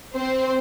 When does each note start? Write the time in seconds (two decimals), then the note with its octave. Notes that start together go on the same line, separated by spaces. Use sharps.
0.14 C4 C5